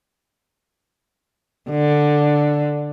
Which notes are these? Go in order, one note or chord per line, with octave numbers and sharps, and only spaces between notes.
D3